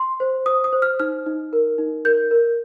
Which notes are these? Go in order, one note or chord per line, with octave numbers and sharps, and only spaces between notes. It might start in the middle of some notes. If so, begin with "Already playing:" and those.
Already playing: C6
C5
C5 D#6
D#6
C5
F6
D#4 F6
D#4
A#4
D#4
A#4 G6
A#4